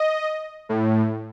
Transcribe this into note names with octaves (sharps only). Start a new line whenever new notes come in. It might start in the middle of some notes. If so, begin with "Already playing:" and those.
Already playing: D#5
A2